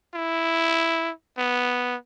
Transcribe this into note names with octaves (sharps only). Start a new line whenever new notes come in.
E4
B3